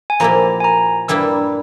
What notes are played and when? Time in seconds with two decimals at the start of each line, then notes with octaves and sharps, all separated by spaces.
0.10 G#5
0.20 A#2 F3 A#3 E4 G4 A#5
0.60 G#5
0.64 A#5
1.08 G2 G3 A#3 E4 E6